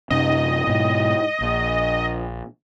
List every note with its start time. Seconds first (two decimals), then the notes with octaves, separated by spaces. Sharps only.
0.10 F#2 C3 C#4 D#5
0.67 G#2 B2
1.41 A#1